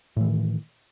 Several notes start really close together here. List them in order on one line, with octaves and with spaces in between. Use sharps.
A2 E3 D#3